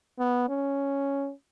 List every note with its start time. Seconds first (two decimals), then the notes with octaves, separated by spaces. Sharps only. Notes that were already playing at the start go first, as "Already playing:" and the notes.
0.19 B3
0.49 C#4